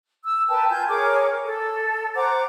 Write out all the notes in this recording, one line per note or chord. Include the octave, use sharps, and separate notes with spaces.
E6
A#4 B4 G5 A5
F4 G#5 G6
G#4 A#4 C#5 D6
A4
C5 F#5 A#5 D6